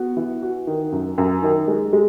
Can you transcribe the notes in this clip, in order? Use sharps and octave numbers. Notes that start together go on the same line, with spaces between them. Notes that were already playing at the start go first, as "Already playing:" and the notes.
Already playing: B3 F#4
E3
F#4
D#3
F#2
F#2
D#3
G#3
G#3